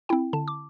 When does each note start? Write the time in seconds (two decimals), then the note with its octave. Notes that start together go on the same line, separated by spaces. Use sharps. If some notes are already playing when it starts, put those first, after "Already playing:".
0.09 C4 E4 G5
0.33 D3 A5
0.48 D6